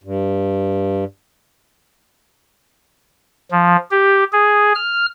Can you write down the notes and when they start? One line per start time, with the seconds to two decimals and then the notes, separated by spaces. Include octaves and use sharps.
0.04 G2
3.51 F3
3.91 G4
4.33 G#4
4.75 F6